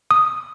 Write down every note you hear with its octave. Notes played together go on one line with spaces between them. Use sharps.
D#6